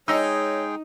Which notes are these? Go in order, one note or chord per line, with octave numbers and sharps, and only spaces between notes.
G#3 D#4 G#4 C#5 D#5 G5 E6